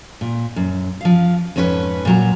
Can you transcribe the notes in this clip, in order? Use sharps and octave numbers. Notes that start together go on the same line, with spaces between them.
A#2
F#2
F3 F5
F2 G#2 C#4 F4 B4
A#2 F#3 A#5